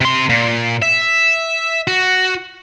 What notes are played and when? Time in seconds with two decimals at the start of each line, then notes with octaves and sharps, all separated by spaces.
0.01 C3 C6
0.29 A#2
0.82 E5
1.87 F#4